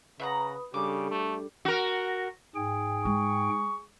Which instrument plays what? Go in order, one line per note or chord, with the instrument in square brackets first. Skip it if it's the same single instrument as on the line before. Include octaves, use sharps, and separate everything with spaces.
[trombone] C#3 [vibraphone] B4 B5 D#6 [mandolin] E5 F#5 A#5
[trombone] C#3 [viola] G3 [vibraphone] D4 G#4 A4 [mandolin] D6
[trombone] A3
[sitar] F#4 A#4
[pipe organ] G#2 G5 [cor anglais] G#4
[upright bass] G#3 [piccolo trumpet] C#6